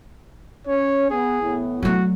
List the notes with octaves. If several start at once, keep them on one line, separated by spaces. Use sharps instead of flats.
C#4 C#5
B3 G#4
A2 E3 B3
F#3 A3 F#4